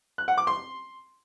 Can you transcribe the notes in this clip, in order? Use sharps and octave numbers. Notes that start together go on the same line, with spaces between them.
F#6
F#5
D6
C6